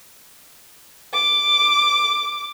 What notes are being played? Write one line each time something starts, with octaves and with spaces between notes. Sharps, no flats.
D6